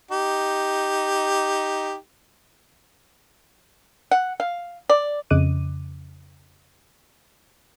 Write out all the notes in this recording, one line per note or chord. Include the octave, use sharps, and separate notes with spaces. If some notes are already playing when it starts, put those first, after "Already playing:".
D#4 G4
F#5
F5
D5
F2 C#3 D#5 D6 F#6 D#7